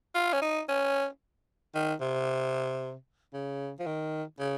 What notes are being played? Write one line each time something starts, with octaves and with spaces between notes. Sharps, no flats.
F4
C#4
D#4
C#4
D#3
C3
C#3
F3
D#3
C#3